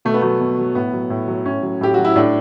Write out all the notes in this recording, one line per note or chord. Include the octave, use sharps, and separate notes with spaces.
B2 A3
B3
F#3 A3
B2
F#3
A2 B3
F#3
A2
F#3
A2 C#4
F#3
A2 G4
F#3 F#4
E4
A2 D4